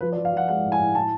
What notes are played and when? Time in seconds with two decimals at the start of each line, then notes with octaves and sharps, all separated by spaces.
0.01 F3 B4
0.12 D5
0.17 F3
0.25 F5
0.32 F3 F#5
0.48 G#3 F#5
0.65 A2
0.72 G#5
0.79 A2
0.95 A2 A5